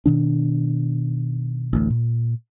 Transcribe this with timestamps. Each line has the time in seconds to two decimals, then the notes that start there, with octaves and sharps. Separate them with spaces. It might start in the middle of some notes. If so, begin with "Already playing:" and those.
0.06 B2 D#3 D4
1.73 A1 D2
1.90 A#2